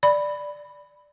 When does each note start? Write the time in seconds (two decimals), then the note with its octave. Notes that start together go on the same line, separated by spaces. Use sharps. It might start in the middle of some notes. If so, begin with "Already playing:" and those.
0.03 D5 B5